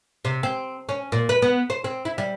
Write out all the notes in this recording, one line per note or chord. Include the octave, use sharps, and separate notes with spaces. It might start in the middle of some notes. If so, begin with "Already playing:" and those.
C3
C4
C#4
A#2
B4
B3
C5
C4
E4
G3